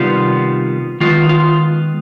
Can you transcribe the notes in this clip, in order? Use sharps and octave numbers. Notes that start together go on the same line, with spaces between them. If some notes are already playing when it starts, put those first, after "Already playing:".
Already playing: C3 D#3 G3 B3 F4
D#3 G#3 B3 F4
F4